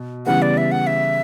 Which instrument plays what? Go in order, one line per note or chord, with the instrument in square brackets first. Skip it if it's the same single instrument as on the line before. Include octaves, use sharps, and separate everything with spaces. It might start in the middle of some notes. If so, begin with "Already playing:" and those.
Already playing: [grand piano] B2
[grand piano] C#3 E3 G3 B3 [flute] F#5
[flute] D5
E5
F#5
E5